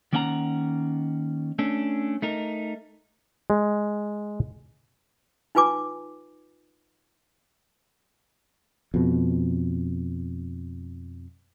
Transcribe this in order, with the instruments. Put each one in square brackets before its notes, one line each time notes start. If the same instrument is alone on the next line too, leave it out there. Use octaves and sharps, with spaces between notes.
[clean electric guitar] D#3 A#3 C#4 F#5 G5 A#5
A3 C#4 D4
A3 D#4 A#4
[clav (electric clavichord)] G#3
[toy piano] D#4 F4 B4 G#5 D6
[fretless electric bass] F2 B2